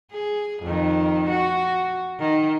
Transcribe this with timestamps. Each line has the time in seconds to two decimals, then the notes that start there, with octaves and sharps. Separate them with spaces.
0.12 G#4
0.63 F2 D#3
1.29 F#4
2.20 D#3